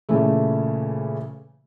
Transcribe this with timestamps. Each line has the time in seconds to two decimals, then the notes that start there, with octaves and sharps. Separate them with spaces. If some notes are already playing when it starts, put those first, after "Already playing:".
0.09 A#2 C#3 E3 A3